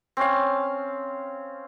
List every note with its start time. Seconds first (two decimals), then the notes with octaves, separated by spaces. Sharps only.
0.17 C4 C#4 F5